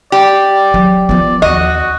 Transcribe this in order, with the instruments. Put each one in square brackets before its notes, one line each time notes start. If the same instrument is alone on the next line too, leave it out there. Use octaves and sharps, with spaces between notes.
[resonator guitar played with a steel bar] G4 [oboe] D5
[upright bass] F#3
[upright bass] F3 B3 [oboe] D5
[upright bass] D#2 [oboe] F#4 [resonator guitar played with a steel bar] D#5